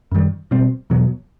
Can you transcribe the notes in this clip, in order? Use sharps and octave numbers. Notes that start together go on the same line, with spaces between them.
F#2 D#3 G3
B2 G3 C4
E2 B2 F#3 B3